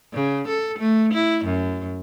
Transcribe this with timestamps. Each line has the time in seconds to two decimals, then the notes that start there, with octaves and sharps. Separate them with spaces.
0.13 C#3
0.48 A4
0.79 A3
1.13 E4
1.45 F#2